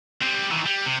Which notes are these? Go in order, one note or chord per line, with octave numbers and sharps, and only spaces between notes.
G3 C4
D#3 E3
G3
C3